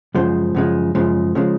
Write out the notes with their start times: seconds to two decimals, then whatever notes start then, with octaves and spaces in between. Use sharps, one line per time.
0.14 F#2 C#3 F3 G#3 C5
0.55 F#2 C#3 F3 G#3
0.95 F#2 C#3 F3 G#3
1.35 C#3 F3 G#3